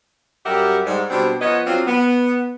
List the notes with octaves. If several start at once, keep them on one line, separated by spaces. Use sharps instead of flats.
F#2 G3 G4 A#4 E5 F#5
G#2 G3
B2 G3 C4 D4
F3 B3 B4 C#5 D#5
F#3 C4 D4 F4
B3